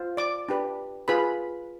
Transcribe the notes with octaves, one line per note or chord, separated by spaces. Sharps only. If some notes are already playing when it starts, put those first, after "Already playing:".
Already playing: F4 C5
D5 D6
D4 G4 B4
F4 G#4 B4 B5